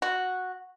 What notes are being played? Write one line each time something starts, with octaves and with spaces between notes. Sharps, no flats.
F#4